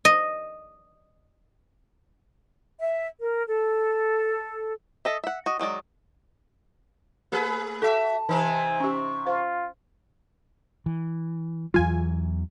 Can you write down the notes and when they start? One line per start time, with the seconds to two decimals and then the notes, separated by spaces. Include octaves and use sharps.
0.05 D#5
2.80 E5
3.20 A#4
3.47 A4
5.05 A4 D#5 E5
5.24 E5 F#5
5.46 F#4 D#5
5.59 D#3 F#3 G#3 D5
7.32 A3 G4 G#4 B4
7.82 F#4 A4 E5 A5
8.29 C3 E3 C4 D#4 G#5
8.80 C#4 G4 C#6
9.27 F4 C5
10.86 E3
11.74 E2 E3 F#3 F4 G#5